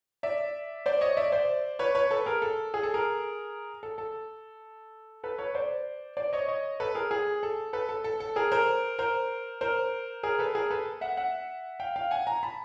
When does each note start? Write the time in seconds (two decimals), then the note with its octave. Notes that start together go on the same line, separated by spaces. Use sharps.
0.23 D5 E5
0.86 C5 D5
1.01 C#5 D#5
1.17 D5 E5
1.32 C5 D5
1.79 B4 C#5
1.95 B4 C#5
2.11 A4 B4
2.26 G#4 A#4
2.42 A4
2.74 G#4
2.83 A4
2.94 G#4 A#4
3.83 A4
3.98 A4
5.24 A4 B4
5.38 B4 C#5
5.55 C5 D5
6.17 C5 D5
6.33 C#5 D#5
6.48 C#5 D#5
6.80 A4 B4
6.95 G#4 A#4
7.11 G#4
7.43 A4
7.73 A4 B4
7.89 A4
8.04 A4
8.20 A4
8.36 G#4 A#4
8.52 A#4 C5
8.99 A#4 C5
9.61 A#4 C5
10.23 G#4 A#4
10.39 A4 B4
10.55 G#4 A#4
10.71 A4 B4
11.01 E5 F#5
11.17 E5 F#5
11.80 F5 G5
11.96 F5 G5
12.11 F#5 G#5
12.27 G#5 A#5
12.43 A5 B5